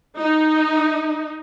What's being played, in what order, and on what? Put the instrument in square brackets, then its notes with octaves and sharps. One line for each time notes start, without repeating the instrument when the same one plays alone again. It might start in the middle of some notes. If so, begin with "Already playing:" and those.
[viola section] D#4